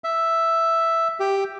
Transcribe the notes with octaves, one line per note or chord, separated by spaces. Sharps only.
E5
G4